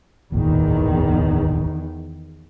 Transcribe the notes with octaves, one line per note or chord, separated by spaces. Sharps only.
D1 G#1 E2 A#2 D#3